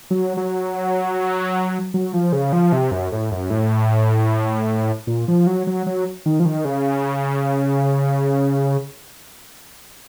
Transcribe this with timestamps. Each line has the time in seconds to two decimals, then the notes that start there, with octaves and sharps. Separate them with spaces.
0.11 F#3
0.37 F#3
1.94 F#3
2.13 F3
2.33 C#3
2.53 F3
2.72 C3
2.91 F#2
3.12 A2
3.32 F#2
3.50 A2
5.07 A#2
5.28 F3
5.47 F#3
5.67 F#3
5.87 F#3
6.26 D#3
6.40 F3
6.45 D#3
6.65 C#3